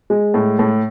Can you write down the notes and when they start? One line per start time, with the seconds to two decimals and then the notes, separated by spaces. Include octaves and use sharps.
0.10 G#3
0.34 A2
0.59 A2